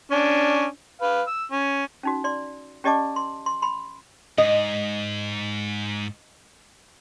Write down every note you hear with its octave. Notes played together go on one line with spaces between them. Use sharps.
C#4 D4
B4 F5
E6
C#4
C#4 D#4 F#4
D5 C6
C#4 G4 D5 D#5 A5 D6
C6
C6
B5 C6
G#2 D#5